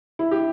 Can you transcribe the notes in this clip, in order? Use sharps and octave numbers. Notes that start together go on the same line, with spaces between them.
E4
G4